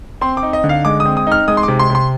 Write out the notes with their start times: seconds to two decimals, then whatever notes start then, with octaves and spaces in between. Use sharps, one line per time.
0.21 C4 C6
0.37 D6
0.43 D#4
0.53 D#5
0.64 D3
0.69 F5
0.85 G#3 D6
1.00 D#6
1.05 C4
1.17 D#6
1.27 D#4 F6
1.48 G#3 D#6
1.57 C6
1.63 D6
1.68 C3
1.79 C6
1.90 C3
1.95 C6